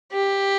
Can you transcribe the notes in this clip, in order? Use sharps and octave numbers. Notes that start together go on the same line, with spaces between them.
G4